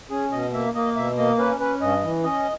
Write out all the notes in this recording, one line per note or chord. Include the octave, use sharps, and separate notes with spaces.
C#4 G#4
B2 D#5
A#3 E5
A#3 D#5
B2 E5
A#3 D#5
C#4 B4
C#4 B4
G2 D#5
E3
C#4 D#5